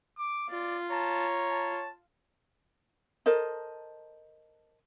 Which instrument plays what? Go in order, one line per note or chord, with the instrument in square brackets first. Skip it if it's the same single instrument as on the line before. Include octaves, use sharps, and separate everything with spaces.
[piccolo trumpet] D6
[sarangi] F4 [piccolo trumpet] D5
[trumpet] C#5 [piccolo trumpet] A5 [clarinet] A#5
[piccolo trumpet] A5
[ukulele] A4 A#4 C5 D#5